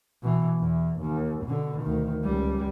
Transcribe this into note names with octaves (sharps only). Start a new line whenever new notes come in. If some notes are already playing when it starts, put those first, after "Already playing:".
B2 E3
E2
D#2
B2 D3
D2 D#3
C#2 G3